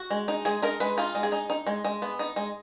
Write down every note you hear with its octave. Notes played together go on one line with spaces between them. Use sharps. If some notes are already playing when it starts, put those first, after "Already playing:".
Already playing: F#4
G#3
D#4
G#3 G#4
D#4 A#4
G#3 B4
D#4 F4
G#3
G#4
D#4
D#4
G#3
G#3
B3
D#4
G#3